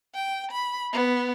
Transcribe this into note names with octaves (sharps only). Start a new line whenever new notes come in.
G5
B5
B3